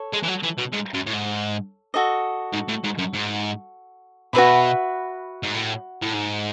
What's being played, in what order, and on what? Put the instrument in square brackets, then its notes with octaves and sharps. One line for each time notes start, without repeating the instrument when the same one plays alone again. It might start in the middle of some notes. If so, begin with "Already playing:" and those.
Already playing: [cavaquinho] A4 C#5
[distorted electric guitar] G#3
E3
F#3
E3
B2
G#2
F#2
A2
G#2
[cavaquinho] F#4 A4 D#5
[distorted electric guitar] G#2
A2
G#2
F#2
G#2
[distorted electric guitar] B2 [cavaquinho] F#4 B4 E5 B5
[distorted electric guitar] G#2
A2
A2
G#2